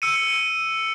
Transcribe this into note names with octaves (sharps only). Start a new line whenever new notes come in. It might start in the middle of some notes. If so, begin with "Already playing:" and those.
E6 C#7 D#7